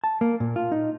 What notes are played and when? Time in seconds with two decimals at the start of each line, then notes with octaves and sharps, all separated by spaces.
0.04 A5
0.21 A#3
0.40 A#2
0.56 F4
0.72 D#4